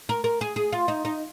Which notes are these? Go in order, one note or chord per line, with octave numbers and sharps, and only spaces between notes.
A#4
A#4
G#4
G#4
F4
D#4
D#4